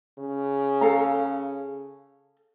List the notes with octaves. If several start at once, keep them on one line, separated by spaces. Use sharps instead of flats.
C#3
A4 F5 A#5